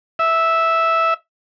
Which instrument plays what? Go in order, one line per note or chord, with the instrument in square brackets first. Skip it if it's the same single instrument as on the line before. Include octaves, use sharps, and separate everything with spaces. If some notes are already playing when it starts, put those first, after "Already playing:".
[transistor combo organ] E5